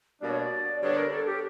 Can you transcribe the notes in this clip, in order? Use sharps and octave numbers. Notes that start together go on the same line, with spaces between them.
B2 G3 A#3 D4 D5
C#5
D5
D3 G3 B3 D4 C#5
A#4
A4
G4